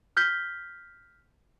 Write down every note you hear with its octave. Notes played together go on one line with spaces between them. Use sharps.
F6 G6 B6 G7